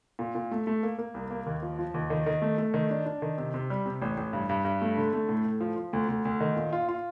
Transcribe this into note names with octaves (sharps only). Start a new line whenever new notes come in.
A#2
A#2
A3
A3
A#3
A#3
C2
A#3
D#2
F3
F3
D#2
D#3
D#3
A3
A3
D#3
D4
D4
D#3
C3
C3
G3
C3
A1
A1
G2
G2
G2
A3
D3
A3
A2
A2
F3
F3
D2
D2
D2
D#3
A#2
F4
F4